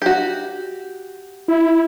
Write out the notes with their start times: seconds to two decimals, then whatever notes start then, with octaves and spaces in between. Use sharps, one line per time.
0.02 F#4 G4
1.48 E4